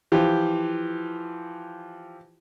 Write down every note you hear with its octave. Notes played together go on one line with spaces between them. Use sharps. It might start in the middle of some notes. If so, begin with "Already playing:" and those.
E3 F3 F4 G4